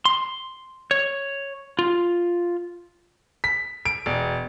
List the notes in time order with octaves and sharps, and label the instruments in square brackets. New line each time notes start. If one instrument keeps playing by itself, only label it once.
[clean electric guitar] C6
C#5
F4
[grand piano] B6
D7
E1